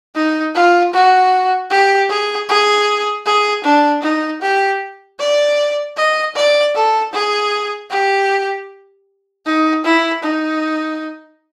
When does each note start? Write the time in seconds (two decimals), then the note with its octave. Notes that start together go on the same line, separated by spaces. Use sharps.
0.15 D#4
0.55 F4
0.93 F#4
1.70 G4
2.09 G#4
2.49 G#4
3.26 G#4
3.64 D4
4.03 D#4
4.42 G4
5.19 D5
5.97 D#5
6.35 D5
6.75 A4
7.13 G#4
7.90 G4
9.46 D#4
9.84 E4
10.23 D#4